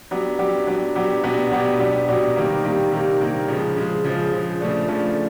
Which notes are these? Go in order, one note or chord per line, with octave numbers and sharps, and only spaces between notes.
F#3 B3 D4 G4
F#3 B3 D4 G4
F#3 B3 D4 G4
F#3 B3 D4 G4
B2 F#3 B3 D4 G4
B2 F#3 B3 D4 G4
B2 F#3 B3 D4 G4
B2 F#3 B3 D4 G4
C3 D#3 G3 A#3
C3 D#3 G3 A#3
C3 D#3 G3 A#3
C3 D#3 G3 A#3
C#3 F3 G#3
C#3 F3 G#3
C#3 F3 G#3
C#3 F3 G#3
C#3 F3 A3 D4
C#3 F3 A3 D4